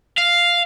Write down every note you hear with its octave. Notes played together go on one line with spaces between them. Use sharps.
F5